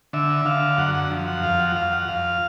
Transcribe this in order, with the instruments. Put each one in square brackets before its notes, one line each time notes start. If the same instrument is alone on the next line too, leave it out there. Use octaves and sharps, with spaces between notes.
[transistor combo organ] D3 E5
D3 F5
F#2 F#5
F#5
F3
F#5
F2 F5
F#5
F2 F5
F#5
F2 F5